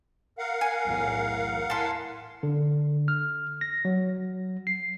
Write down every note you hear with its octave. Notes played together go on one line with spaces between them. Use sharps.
A#4 F5 F#5
G#5
B1 E2 A2
A2 G#5 A5 C6 B6
D3
F6
A#6
F#3
C7